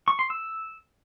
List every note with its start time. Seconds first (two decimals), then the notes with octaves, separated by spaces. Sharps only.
0.08 C#6
0.19 C6
0.30 E6